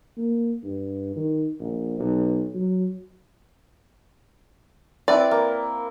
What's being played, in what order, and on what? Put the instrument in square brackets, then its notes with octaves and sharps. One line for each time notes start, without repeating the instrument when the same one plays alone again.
[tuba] A#3
G2
D#3
A#1
B1
F#3
[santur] C4 E4 [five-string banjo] B4 D5
[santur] A#3